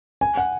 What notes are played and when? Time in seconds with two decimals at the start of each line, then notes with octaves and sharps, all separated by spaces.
0.21 G#5
0.37 F#5